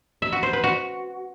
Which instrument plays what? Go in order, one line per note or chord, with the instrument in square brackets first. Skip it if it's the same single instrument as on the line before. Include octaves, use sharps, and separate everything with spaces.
[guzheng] E5
F#4
C5
B4
F#4